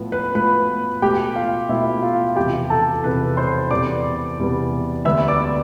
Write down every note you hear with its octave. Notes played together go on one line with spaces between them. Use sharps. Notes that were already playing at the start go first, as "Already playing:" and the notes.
Already playing: A2 F3 B3
B4 B5
A2 F3 B3 B4 B5
B2 A3 G4 G5
F4 F5
B2 A3 E4 E5
F4 F5
E2 C3 F3 G4 G5
A4 A5
E2 C3 F3 B4 B5
C5 C6
E2 C3 G3 B3 D5 D6
E2 C3 G3 B3
D2 D3 G3 B3 E5 E6
D5 D6